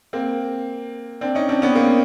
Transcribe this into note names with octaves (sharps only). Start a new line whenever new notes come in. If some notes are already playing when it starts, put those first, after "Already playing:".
A#3 C4
C4 D4
C#4 D#4
C4 D4
B3 C#4
A#3 C4